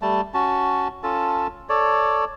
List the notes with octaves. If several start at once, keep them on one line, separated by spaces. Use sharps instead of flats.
G3 A3 A5
C#4 F#4 A5
C#4 F4 A4 A5
A4 C#5 D5